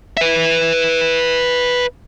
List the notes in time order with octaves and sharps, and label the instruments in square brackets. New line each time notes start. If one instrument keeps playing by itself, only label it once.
[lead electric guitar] B4 E5